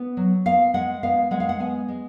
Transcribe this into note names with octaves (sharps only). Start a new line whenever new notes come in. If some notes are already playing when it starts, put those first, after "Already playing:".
Already playing: B3
F#3
B3 F5
G#3 F#5
B3 F5
G#3 F#5
F5
F#5
B3 G#5
G#3